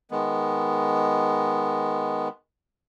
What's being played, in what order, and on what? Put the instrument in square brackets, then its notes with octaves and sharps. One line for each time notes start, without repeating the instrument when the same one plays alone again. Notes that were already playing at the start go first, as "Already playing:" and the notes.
[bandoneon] D#3 G#3 B3